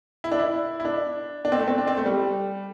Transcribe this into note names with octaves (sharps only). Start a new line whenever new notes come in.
E4
D4
E4
E4
D4
D4
C4
A3
C4
D4
C4
A3
G3